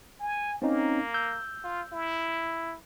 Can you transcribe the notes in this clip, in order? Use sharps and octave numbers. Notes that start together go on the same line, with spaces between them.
G#5
A#3 C4 C#4 D#4
E6 G6
F4
E4